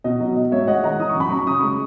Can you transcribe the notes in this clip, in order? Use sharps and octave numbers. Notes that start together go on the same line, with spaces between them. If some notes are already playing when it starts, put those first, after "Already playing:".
B2 D#5
F#3
F#3 D#5
G#2 C#5 E5
G#3 D#5 F#5
D#3 F#5 A#5
E3 D#6
C#6
F#2 B5
F#2 A#5 C#6
C#3 D#6
G#3 C#6